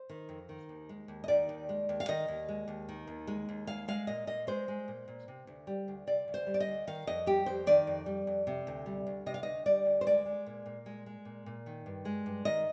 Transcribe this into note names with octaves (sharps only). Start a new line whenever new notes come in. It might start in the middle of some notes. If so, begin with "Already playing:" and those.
Already playing: C5
D#3
F2
D#3
D#2
G#3
D#2
D#5
D#3 D5
D#2
G#3
D#2
F5
D#3 D#5
D#2
G#3
D#2
D#3
D#2
G#3
D#2
G#3 F5
G#3 F5
A#2 D#5
A#2 D#5
G#3 C5
G#3
A#2
A#2
C3
D2
G3
D2
C3 D5
D2
C5
G3
D5
D#5
D2
D#3 F5
F2 D#5
G3 G4
F2 C5
D#3 D5
F2
G3
F2
C3
D2
G3
D2
C3 D#5
F5
D2 D#5
G3 D5
D2
C5
G#3 D5
G#3
A#2
A#2
G#3
G#3
A#2
A#2
D#3
G2
G#3
G2
D#3 D#5